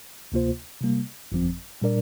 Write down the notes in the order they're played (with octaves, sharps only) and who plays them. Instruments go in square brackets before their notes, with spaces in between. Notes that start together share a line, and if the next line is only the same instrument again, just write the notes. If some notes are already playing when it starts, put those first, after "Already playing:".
[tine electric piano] D2 C3 A#3 F4 C5
C3 G3 A#3
G1 F2 F3 C4
A#2 G3 D4 A#4 D5